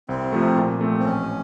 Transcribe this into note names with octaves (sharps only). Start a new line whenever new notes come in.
C2 C4
C3 F3 A3
A#2
F3 A3 C4
C4
A1 C#4